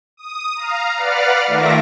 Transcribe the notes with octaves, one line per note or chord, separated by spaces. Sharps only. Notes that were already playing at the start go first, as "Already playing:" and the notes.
D#6
F5 A#5
B4 D5 F5 F#5 F6
D#3 A3 F4 E5 D6 A#6